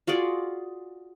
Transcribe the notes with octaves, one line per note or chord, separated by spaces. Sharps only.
F4 F#4 G#4 D5